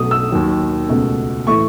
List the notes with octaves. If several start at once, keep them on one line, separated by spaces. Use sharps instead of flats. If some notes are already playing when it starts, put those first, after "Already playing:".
Already playing: B1 B2 A3 D#6
E6
D#2 D#3 F#3
C#2 B2 A3
A2 E3 A3 E4 C#6